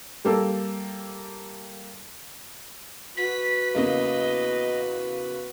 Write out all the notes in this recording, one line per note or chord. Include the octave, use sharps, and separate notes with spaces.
G3 A#3 A4
F#4 B4 B6
E2 C#3 A#3 D#5